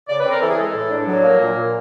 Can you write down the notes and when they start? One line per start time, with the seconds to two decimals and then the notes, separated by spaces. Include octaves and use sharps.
0.09 C#3 D5
0.20 B4
0.26 C4 A#4
0.41 E3 A4
0.50 G#4
0.57 G#3 A4
0.75 A2
0.91 D4
1.07 F#3
1.24 A#3
1.40 A#2
1.56 A#2